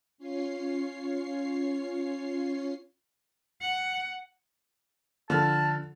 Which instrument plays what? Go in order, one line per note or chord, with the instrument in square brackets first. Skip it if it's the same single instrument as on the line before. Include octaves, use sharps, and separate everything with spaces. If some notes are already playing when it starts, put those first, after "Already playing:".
[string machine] C#4 F4 C#5 C7
[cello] F#5
[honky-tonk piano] D3 F6 [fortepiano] F3 A4 [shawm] A5